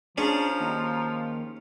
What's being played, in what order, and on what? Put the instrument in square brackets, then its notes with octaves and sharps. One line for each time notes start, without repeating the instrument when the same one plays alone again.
[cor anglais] F3 [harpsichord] C#4 G#4 [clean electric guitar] D4 [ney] A#5
[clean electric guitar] D#2